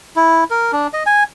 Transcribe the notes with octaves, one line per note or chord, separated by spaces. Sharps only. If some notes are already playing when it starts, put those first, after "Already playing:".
E4
A#4
D4
D#5
G#5